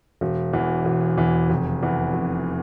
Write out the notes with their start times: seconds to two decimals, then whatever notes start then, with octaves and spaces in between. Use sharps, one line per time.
0.21 E1
0.53 E2 E3
0.85 E1
1.17 E2 E3
1.49 F1
1.82 E2 E3
2.13 F1